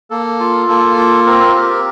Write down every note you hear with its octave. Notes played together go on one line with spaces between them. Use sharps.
A#3 A4
F4
A#3 A4
F4
C4 A#4
G4 A#4